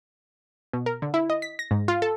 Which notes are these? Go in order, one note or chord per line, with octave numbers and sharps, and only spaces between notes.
B2
A#4
D3
E4
D#5
B6
A#6
G#2
F4
A4